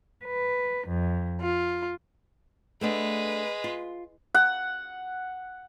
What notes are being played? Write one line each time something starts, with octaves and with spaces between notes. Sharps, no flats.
B4
F2
F4
G#3 A3 B3 D4 B4
F4
F#5